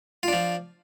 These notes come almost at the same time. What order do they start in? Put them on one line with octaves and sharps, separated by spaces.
F4 D4 F3